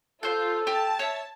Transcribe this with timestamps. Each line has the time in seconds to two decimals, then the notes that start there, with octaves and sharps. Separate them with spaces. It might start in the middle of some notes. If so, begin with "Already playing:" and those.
0.23 F4 A4 C5 G6
0.67 G4 A5
0.99 C#5 E5